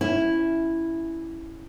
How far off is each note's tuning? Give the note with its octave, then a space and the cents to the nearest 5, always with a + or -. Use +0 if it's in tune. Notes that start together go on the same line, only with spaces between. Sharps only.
C#4 +0 E4 +0